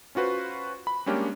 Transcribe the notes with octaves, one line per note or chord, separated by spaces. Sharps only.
C#4 F4 F#4 B4 C5
B5
G3 G#3 A#3 C#4 D4 G4